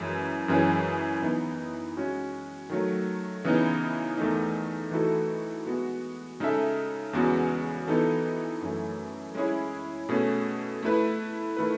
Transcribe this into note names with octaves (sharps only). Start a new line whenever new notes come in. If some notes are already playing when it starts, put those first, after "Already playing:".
Already playing: F#2 E3 G#3
F#2 E3 G#3 C#4 G#4
E3 B3 D#4
G#3 C#4 F#4
D#3 F#3 A3
C#3 E3 B3 D#4
E2 D#3 A3 D#4
E3 A3 D#4 F#4 A4
G#3 B3 F#4
C#3 G#3 D#4 A4 E5
E2 C#3 G#3 B3 F#4
E3 B3 D#4 A4
F#2 E3 A3
G#3 C#4 E4 G#4 C#5
B2 A3 C#4 G#4
A3 E4 B4
D#3 A3 E4 B4